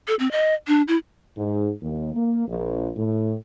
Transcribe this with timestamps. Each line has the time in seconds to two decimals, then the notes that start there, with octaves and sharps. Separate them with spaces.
0.08 A4
0.19 C4
0.32 D#5
0.67 D4
0.88 E4
1.37 G#2
1.82 D#2
2.14 A#3
2.48 A#1
2.97 A2